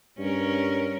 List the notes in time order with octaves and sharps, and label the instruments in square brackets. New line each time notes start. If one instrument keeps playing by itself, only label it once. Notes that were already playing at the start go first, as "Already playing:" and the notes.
[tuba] G2 [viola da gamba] C#4 A#4